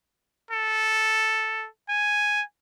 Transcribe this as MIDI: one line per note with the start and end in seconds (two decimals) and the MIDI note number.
0.51 1.66 69
1.89 2.42 80